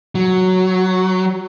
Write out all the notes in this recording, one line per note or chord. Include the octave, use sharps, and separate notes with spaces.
F#3